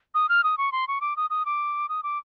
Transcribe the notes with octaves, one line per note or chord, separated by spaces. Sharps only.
D#6
F6
D#6
C#6
C6
C#6
D6
D#6
D#6
D6
D#6
D6